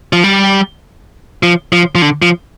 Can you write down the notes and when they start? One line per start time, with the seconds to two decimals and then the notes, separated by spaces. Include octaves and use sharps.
0.13 F3
0.24 G3
1.43 F3
1.73 F3
1.95 F3
2.02 D3
2.22 F3